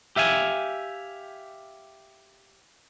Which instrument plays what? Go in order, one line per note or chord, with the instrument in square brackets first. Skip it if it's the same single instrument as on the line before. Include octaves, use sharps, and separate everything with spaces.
[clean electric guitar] G4 E5 F5 G#5